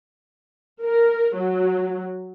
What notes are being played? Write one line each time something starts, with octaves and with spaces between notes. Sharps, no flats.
A#4
F#3